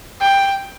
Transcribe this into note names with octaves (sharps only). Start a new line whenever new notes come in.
G5